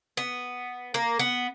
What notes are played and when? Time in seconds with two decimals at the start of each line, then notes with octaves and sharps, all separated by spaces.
0.17 B3
0.94 A#3
1.19 B3